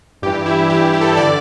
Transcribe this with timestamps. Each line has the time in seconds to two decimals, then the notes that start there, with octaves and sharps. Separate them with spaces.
0.22 G2 E3 G4
0.46 E4
0.70 G2 E3 G4
0.93 G4
1.01 A4
1.17 D3 D5